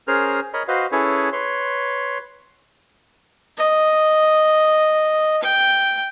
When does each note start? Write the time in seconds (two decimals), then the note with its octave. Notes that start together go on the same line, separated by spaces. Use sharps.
0.08 C#4 G#4 A#4 C5 F6
0.54 A#4 C#5 D#5 B5
0.68 F#4 B4 C5 D#5 F5
0.92 C#4 E4 G#4 A4 B4 C#5
1.33 B4 C#5 C6
3.57 D#5
5.42 G5